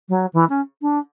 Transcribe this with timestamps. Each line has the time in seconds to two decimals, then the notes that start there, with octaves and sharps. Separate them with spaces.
0.09 F#3
0.33 E3
0.49 C#4
0.81 D4